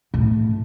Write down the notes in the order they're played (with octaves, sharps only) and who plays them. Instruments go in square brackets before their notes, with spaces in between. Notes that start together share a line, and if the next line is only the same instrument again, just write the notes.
[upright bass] A2